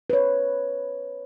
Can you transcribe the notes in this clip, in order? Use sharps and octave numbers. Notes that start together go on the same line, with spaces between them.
B4 C#5